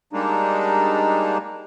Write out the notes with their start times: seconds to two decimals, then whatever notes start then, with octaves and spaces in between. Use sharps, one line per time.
0.13 G3 G#3 A#3 D4 D#4